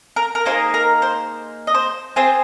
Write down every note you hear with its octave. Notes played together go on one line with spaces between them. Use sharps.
A#4
A#4
A#3 D#4 G#4 C5
A#4
C5
D#5
C5
C4 F4 G#4 C5